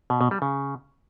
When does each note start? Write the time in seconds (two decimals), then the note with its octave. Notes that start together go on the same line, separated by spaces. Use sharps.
0.10 B2
0.21 B2
0.31 G3
0.42 C#3